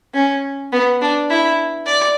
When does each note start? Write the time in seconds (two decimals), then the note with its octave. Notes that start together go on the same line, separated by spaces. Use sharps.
0.14 C#4
0.72 B3
1.01 D4
1.30 E4
1.86 D5